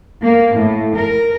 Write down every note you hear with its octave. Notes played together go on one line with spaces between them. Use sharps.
A#3
A2
A#4